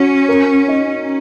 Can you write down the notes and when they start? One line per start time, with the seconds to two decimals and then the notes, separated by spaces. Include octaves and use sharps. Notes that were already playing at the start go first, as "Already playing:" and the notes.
Already playing: C#4 F#4
0.29 A#4
0.68 D#4